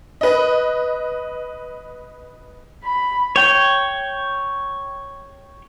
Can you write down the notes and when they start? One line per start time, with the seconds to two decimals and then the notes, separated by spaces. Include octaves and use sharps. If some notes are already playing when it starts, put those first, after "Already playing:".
0.21 B4 D#5
2.84 B5
3.36 C#5 G5